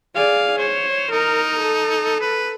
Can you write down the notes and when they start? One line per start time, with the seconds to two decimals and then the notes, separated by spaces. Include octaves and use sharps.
0.15 G#4 D5 F5
0.58 C5 C#5
1.11 D#4 A#4
1.60 A4
2.20 B4